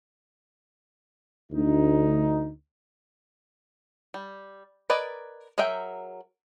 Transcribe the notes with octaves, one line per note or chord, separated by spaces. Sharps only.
D2 D#4
G3
A#4 B4 D5 D#5 G#5
F#3 G#4 A#4 E5 G5